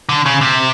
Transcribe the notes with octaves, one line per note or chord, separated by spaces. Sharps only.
D3
C#3
C3